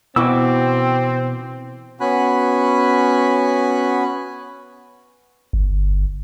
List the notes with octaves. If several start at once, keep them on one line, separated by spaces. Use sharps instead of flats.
B2 E3 C4 F#4 G5 D6 E6
B3 C#4 F#4 G#5 B5 F#6
G1